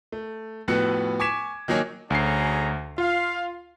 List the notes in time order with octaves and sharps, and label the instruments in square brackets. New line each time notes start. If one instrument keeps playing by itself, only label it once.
[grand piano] A3
F2 A2 B3 F#4 B4 C#7
G#5 C#6 D6 G#6 B6 E7
D#3 F#3 A#3 C#5 G#5
[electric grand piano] D2 C7 [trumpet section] C#4 G#4 A#5
[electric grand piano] F4 [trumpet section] F5